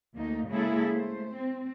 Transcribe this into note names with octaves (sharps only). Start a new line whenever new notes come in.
D2 A3 A#3 D#4
C#3 G#3 A#3 E4 G#4 A4
A3 C5
C4